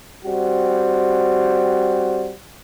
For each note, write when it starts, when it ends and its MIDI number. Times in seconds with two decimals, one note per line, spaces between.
0.25 2.32 55
0.25 2.32 60
0.25 2.32 66